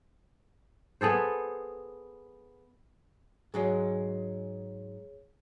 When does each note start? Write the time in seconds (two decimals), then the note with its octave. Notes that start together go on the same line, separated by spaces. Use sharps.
1.01 B3 G#4 A4 C5
3.54 G#2 F#3 G#3 G#4 C#5